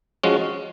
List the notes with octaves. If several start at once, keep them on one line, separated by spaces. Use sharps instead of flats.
F3 G#3 C#4 F#4